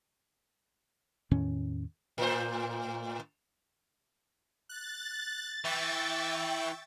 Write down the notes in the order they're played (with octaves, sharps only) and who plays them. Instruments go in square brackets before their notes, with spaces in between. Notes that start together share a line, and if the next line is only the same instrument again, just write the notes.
[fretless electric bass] E2 A2 D#3 C#4
[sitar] A2 C5
[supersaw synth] F#6 [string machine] A6
[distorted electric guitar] E3 [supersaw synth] E5 G5 C#6